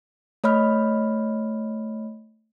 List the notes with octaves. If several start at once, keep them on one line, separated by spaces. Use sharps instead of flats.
A3 C#5 D#5 B5 F6